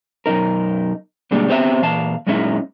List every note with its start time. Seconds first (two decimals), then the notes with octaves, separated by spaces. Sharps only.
0.26 B1 F#2 A#2 D#4 A#4
1.31 B2 D3 G3 G#3 A#3
1.49 B3 C4 G4 C#5 D5 E5
1.82 A#2 E3 F5 A5
2.27 F#2 A#2 G#3 C#4 D#4 E4